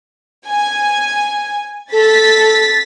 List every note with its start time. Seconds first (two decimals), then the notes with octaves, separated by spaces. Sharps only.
0.48 G#5
1.92 A4 A6 B6